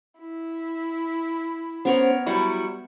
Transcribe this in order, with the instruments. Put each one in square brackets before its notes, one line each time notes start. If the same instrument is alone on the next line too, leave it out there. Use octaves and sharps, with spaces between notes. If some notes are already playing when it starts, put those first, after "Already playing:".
[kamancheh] E4
[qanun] B3 A#4 C#5 [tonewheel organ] C#4 C5
[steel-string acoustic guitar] F#3 G3 E4 [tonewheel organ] C#6